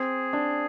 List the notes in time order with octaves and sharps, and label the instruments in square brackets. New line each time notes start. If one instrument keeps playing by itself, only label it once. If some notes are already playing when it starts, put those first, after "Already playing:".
Already playing: [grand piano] C4 [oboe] G#4
[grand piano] D4